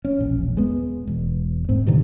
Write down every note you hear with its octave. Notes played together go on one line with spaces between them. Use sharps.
C#4
E1 A#1
G#3 B3
E1
G#2 C4
G2 B2 D3 D#3